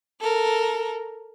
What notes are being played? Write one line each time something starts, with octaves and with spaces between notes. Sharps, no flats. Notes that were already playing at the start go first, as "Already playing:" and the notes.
A4 A#4